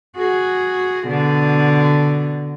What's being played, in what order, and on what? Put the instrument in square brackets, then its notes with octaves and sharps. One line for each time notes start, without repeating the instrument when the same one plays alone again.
[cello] F#4 G#4
B2 D3